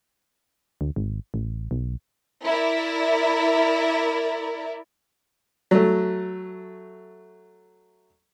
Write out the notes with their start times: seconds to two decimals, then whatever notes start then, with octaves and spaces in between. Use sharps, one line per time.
0.81 D2
0.96 G#1
1.34 A1
1.71 B1
2.46 E4 A#4 D5
5.71 F#3 A3